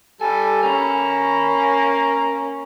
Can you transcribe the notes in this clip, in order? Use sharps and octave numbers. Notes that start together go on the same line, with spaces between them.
G3 A4 G#5
A#3 C#4 G#5 A#5 B5